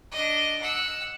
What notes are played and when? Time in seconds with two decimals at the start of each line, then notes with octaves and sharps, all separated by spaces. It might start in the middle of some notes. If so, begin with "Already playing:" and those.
0.11 D4 D#5
0.61 F#5 E6